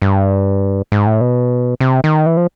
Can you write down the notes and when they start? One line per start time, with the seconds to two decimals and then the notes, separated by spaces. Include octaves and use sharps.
0.02 G2
0.92 G#2
1.06 A2
1.21 B2
1.80 C3
2.04 D#3
2.26 E3
2.37 F3